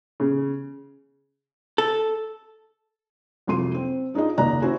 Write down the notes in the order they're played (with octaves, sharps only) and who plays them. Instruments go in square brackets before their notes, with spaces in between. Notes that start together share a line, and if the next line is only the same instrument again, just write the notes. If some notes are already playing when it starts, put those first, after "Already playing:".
[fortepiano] C#3
[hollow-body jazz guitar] A4
[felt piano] C2 F2 F#3 C6 D#7
C4
D4 D#4 F4 G#4 D#5
F#1 D#2 D5 D#5 A#5 F#6
C#4 E4 F#4 C5 G#5